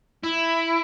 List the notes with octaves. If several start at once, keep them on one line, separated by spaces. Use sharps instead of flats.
E4